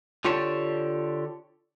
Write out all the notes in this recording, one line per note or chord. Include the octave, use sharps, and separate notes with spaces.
D3 F4 G4 C#5 D5 A5